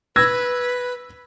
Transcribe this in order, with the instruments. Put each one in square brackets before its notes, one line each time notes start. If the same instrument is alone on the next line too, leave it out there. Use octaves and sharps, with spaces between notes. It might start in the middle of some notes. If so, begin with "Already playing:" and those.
[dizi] B4 [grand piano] E6 G#6 A#6